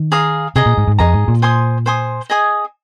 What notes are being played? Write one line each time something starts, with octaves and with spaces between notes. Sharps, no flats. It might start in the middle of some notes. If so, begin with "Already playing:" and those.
Already playing: D#3
G#4 F5 A#5 D#6
C3 G#4 D#5 A#5
A#2
G#2
G#2
F2 G#4 D#5 A#5
G#2
A#2
C5 G#5 C6 D#6
C5 G#5 C6 D#6
G#4 D#5 G#5 D#6